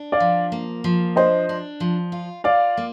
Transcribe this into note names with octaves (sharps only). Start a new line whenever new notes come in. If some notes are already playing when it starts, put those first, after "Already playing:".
Already playing: D4
D5 F5
F3
A#3
F3
D4 C5 D#5
D4
F3
F4
F4 D5 F5
A#3